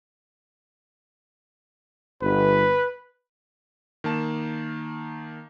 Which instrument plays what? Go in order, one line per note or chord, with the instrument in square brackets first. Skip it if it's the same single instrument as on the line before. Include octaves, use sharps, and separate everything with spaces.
[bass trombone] G1 [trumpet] B4
[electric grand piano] D#3 A#3 A5 E7